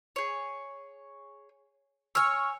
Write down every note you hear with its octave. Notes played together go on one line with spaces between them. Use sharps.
G#4 C#5
C#5 G#5 E6 F6